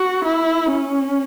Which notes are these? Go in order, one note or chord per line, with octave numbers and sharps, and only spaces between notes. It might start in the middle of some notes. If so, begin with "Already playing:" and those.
Already playing: F#4
E4
C#4